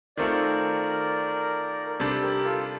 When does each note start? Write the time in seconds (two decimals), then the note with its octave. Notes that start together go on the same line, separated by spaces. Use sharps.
0.17 D#3 A3 C4 F4 A4 A#4 D5
1.89 A#4
2.00 C3 G3 D4 A4 C5
2.22 G4 A#4
2.45 F4 A4